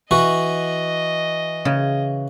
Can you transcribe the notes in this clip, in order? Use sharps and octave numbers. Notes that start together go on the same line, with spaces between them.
E3 F#4 D#5
C#3